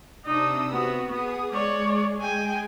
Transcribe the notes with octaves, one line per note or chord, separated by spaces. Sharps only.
C3 D4 D#4 D#6 E6
B3 F#4
B3 G#4 D#6
G#3 C#5 D5
G5 G#5